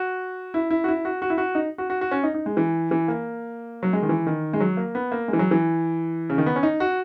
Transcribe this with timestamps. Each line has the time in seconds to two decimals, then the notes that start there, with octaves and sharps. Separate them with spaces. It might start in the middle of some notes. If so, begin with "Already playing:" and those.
Already playing: F#4
0.54 E4
0.71 E4
0.84 F#4
0.88 E4
1.05 F#4
1.22 F#4
1.30 E4
1.38 F#4
1.55 D#4
1.78 F#4
1.90 F#4
2.01 F#4
2.11 C#4
2.23 D#4
2.34 D#4
2.46 G#3
2.57 E3
2.91 E3
3.08 A#3
3.83 F#3
3.93 G#3
4.03 D#3
4.09 E3
4.27 D#3
4.53 G#3
4.60 F#3
4.77 A#3
4.95 B3
5.12 A#3
5.28 G#3
5.33 E3
5.39 F#3
5.51 E3
6.30 C#3
6.38 D#3
6.46 B3
6.56 C#4
6.63 D#4
6.80 F#4